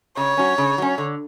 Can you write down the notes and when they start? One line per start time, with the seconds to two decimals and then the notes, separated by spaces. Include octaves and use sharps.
0.17 C#3 C#5
0.37 F#3 C#4
0.58 C#3
0.78 F#3 C#4
0.98 D3